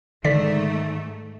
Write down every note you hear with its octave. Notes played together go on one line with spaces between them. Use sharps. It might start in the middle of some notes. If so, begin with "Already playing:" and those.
G#2 D3 D#3 A3 D5 B6